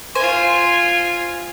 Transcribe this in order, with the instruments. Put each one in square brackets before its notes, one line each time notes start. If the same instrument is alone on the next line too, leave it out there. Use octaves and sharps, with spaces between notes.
[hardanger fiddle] F4 G#5 [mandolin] C5